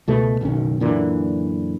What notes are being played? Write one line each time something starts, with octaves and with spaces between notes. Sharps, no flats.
C#2 B2 A3
F#1 B1 D#3 C#4
F#2 A#2 D3 E3